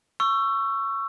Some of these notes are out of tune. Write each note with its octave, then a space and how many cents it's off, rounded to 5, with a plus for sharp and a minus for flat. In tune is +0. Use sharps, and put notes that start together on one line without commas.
C#6 +0 E6 +25